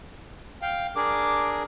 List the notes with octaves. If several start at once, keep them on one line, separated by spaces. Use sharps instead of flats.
F5 G5
D4 G#4 A#4 D6